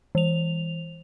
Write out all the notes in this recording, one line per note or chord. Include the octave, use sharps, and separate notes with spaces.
E3 F7